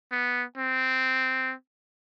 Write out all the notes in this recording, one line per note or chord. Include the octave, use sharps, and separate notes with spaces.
B3
C4